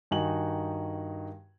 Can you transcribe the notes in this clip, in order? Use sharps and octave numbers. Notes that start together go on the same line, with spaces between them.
G2 D#3 D#4 F#4 G#5 F#7